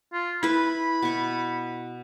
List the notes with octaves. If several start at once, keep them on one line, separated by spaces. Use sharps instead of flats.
F4
E4 B4 B5
B2 C#6